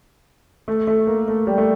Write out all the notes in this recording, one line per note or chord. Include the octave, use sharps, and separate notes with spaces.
A3
A3
A#3
A3
G3
A3